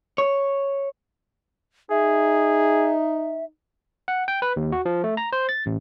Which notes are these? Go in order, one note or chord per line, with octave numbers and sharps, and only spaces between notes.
C#5
D#4 G#4 E5
F#5
G5
B4
D#2
F#4
F3
A3
A#5
C5
A6
A1